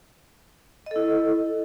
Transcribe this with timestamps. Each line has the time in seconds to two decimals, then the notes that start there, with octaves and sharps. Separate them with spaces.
0.86 D#5
0.91 A4
0.96 E4